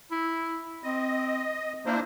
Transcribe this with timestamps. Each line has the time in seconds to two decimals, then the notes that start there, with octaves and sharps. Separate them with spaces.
0.11 E4
0.83 C4 D#5
1.86 A#3 D4 E4 C5